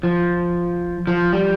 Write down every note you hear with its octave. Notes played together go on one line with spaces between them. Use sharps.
F3
F3
G3